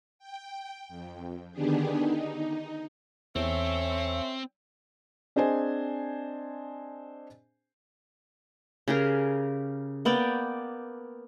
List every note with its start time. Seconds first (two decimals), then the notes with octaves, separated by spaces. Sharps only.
0.19 G5
0.89 F2
1.52 D3 D#3 B3 D4 G4 G#4
1.99 D#4
3.36 E2 C4 C#4 A4 C#5 E5
5.36 C4 D4 G#4 C5 D#5 G#5
8.88 C#3 G4 G#4 A#4
10.05 A#3 B3 D5 G5